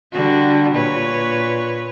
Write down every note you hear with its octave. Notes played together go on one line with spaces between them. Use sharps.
D3 G3 F#4
A#2 B4 C#5